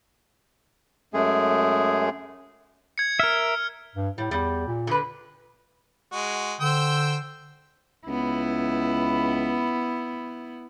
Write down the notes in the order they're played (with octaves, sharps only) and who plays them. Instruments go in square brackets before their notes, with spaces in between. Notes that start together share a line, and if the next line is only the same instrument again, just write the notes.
[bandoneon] F#2 G#3 A3 G#4
[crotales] G#6 C#7
[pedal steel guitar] A#4 E5 [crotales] F6
[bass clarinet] G2
[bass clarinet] A2 [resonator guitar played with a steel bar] G3
[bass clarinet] E2 [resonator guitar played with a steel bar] G3
[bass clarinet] A#2
[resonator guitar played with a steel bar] D3 B4
[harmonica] G#3 F#4
[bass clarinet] D3 [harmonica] C5 G5 E6
[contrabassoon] C#2 [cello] B3 E4